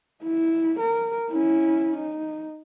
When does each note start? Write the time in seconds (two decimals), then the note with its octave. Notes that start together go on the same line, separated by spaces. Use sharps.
0.24 E4
0.79 A#4
1.31 C#4 E4
1.97 D#4